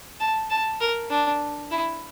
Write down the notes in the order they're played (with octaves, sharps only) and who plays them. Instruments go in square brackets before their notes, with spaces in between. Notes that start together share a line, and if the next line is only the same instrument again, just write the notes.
[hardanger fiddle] A5
A5
A#4
D4
E4